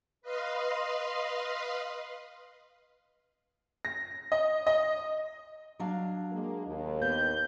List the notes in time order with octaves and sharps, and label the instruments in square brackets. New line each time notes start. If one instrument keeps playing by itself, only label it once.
[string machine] B4 D#5 F5 C6
[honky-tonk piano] A#6
D#5
D#5
[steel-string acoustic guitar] F#3 D4 F5
[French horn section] G#3 A#3
D#2
[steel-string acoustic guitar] B3 [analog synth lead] G6